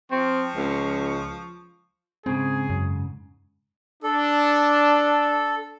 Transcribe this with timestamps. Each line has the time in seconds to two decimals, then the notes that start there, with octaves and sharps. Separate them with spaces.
0.11 F3 C4 C#6
0.56 C#2
2.26 G#2 C#3 C4 G#4
2.70 F#2
4.03 D4 A4